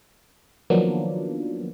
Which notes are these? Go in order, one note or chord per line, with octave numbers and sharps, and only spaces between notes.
D#3 F3 F#3 A#3 B3 D4